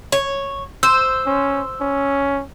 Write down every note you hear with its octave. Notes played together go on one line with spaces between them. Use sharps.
C#5
C5 E6
C#4
C#4